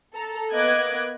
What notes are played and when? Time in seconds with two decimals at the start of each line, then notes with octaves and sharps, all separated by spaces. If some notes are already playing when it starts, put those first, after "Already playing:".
0.14 A4 A#5
0.53 A#3 B3 D#5 D6 F#6 G#6